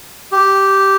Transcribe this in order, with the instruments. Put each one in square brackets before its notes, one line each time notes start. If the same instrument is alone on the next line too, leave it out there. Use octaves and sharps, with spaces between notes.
[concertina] G4